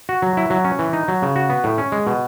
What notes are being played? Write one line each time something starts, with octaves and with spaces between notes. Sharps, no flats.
F#4
F#3
E4
F#3
C#4
E3
D#4
F#3
C#3
F#4
B3
A2
C#4
G#3
B2